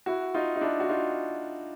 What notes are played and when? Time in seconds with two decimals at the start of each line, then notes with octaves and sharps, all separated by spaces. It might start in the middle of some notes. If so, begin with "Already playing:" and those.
0.06 E4 F#4
0.34 D#4 F4
0.56 D#4
0.61 D4 E4
0.80 F#4
0.89 D#4 F4